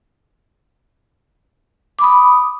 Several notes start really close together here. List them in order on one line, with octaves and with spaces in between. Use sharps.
D6 B5 D#6